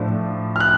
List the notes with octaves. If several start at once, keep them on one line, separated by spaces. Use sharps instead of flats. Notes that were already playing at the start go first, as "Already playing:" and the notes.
Already playing: A2 F3 A3 D4
F6
F#6